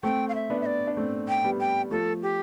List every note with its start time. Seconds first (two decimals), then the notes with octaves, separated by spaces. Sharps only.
0.03 A3 C4 G5
0.29 F5
0.35 E5
0.50 B3 D4
0.61 E5
0.66 D5
0.87 D4
0.97 A3 C4
1.28 G5
1.44 G3 B3
1.60 G5
1.91 F3 A3 A4
2.22 G4